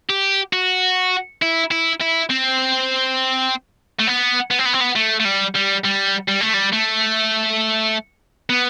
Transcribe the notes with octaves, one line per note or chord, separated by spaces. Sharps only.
G4
F#4
E4
E4
E4
C4
A3
B3
B3
C4
B3
C4
B3
A3
A3
G3
G3
G3
G3
A3
G3
A3
B3